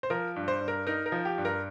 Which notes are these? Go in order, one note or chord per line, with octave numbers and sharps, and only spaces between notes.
C5
F3 A#4
G2
C5
G2
A#4
D#4 A#4
A#4
F3
G4
G2
A#4